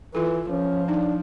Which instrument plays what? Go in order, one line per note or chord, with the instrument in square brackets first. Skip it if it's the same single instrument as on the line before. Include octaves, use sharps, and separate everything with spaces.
[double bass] E3 [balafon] F4 A4
[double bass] F3 [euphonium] C#4
[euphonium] D4 [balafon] D#4